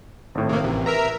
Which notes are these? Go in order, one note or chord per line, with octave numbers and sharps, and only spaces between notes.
G#1 A2
C3 A#3
A1 C3 E3
A#4 B4 E5 A#5